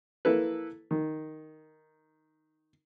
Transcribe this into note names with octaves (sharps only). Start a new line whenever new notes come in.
A#3 E4 A4 B4
D#3